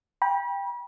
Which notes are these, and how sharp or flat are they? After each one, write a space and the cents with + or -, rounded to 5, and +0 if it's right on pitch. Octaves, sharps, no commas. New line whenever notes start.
G5 +20 B5 -35